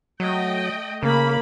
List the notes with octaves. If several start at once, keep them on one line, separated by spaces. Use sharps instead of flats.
F#3 A3 D#5 G5
C#3 A#3 B5